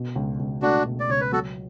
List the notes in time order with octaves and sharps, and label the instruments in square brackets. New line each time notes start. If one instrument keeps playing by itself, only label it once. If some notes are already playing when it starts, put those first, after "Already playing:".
Already playing: [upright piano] B2
C#2
C#2
[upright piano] A3 [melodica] D4 F#4
[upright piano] B2
[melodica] D5
[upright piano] C#2 [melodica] C#5
[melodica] B4
[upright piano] F#3 [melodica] F#4 A4